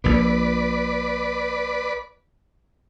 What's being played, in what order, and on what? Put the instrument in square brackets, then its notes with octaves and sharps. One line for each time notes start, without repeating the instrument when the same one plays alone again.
[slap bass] A#1 A#2 [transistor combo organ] B4 D5